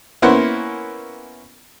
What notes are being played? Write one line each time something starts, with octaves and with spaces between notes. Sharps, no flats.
A#3 B3 C#4 E4 C5 F#5